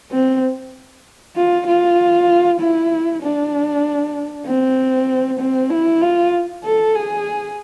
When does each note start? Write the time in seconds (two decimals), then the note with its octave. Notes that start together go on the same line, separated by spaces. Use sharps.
0.12 C4
1.36 F4
1.67 F4
2.60 E4
3.22 D4
4.46 C4
5.39 C4
5.70 E4
6.01 F4
6.64 A4
6.95 G#4